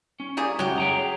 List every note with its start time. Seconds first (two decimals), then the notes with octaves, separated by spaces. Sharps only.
0.20 C#4
0.37 G3 A#3 G#4
0.59 C#2 F#2 F#3 G4
0.78 G#4 G5 A#5